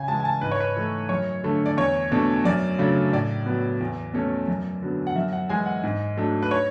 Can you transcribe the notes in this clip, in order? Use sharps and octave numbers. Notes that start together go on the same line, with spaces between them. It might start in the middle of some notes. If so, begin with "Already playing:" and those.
Already playing: C#3 G#5
E3 G#3 A5
G#5
A5
G#2 B4
C#5
B4
E3 A3
F#2 C#5
D3 A3
D5
E2 C#5
B2 A3 D4
F#2 D5
C#3 F#3 A3 D4
A2 D5
F#3 B3
E2
B2 A3 C#4
F#2
D3 F#3 B3
F#5
F#2 E5
F#5
E3 G#3 G#5
F#5
G#2
F#3 A3 D4
B4
C#5